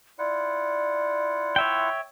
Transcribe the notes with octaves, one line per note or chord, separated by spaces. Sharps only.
E4 F4 D5 F#5
C#5 E5 G5